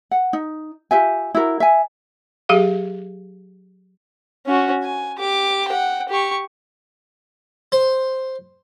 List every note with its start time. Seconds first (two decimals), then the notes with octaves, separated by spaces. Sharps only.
0.11 F#5
0.33 D#4
0.91 F4 G4 E5 G#5
1.35 E4 F#4 A#4
1.60 E5 G#5
2.49 F#3 G4 G#4 F5
4.46 C#4 F#4
4.83 G#5
5.18 G4 D6
5.68 F#5 G5
6.09 G4 C#6
7.72 C5